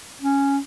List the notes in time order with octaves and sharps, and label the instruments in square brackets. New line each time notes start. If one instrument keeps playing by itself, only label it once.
[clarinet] C#4